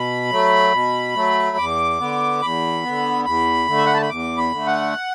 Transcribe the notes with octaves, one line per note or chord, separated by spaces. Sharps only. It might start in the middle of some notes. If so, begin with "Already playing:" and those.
Already playing: B2 B5
F#3 A3
B2
F#3 A3
E2 D6
D3 B3
E2 B5
D3 B3
E2 B5
D3 A3
E5
F#5
A5
B5
E2 D6
B5
D3 A3
F#5